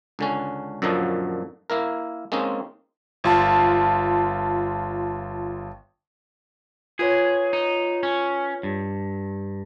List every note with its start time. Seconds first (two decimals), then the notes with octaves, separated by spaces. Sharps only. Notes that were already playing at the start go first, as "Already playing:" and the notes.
0.19 C#2 D3 C#4
0.82 F#2 A#2 D3 F3 F#3 D#4
1.70 A#3 E4 A#4
2.32 G#3 A#3 C4 C#4 D#4
3.24 G1 F4 A5
6.99 F4 G#4 B4 C#5
7.53 D#4
8.03 C#4
8.63 G2